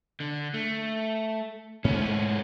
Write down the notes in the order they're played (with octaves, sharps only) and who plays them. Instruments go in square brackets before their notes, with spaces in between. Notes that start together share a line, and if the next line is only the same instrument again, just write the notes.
[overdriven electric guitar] D3
A3
[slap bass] G#2 A3 [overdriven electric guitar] B3 C#4